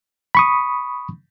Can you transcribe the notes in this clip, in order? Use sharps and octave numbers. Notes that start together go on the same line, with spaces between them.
B5 C#6 D#6